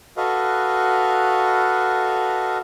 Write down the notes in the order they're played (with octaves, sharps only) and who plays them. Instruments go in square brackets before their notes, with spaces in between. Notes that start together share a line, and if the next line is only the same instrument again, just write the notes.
[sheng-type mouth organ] F#4 A4 B4 D#5 F5